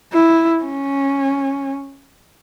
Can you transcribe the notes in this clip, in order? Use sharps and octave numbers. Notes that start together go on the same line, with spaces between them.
E4
C#4